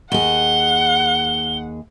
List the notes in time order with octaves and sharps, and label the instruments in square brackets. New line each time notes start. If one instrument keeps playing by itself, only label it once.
[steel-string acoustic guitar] D#2 G#4 [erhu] F#5 [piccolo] G7